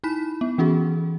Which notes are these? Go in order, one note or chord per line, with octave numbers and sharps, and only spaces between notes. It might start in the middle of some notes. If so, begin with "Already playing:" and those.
D#4 E4 B5 B6
B3
E3 C#4 F#4 G#4